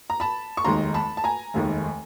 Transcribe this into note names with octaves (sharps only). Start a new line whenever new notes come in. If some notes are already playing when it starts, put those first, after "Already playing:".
A#5
A5 B5
C#6
F1 D#2 D#3 G#3 A#5 C6
A5 B5
A5
G#5 A#5
F1 D#2 D#3 G#3